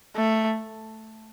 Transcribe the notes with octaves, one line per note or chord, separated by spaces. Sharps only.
A3